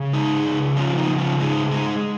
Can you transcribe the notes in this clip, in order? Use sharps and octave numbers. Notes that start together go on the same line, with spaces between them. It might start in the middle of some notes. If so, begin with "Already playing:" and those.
Already playing: C#3
G#3 D#4 G#4
C#3
F3 C#4 F4
A#3 D#4
C#3
C#4 F4
G#3 D#4 G#4
G#3 D#4 G#4